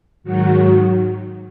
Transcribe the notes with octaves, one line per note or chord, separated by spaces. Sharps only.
G#2 D#3 F#3 F#4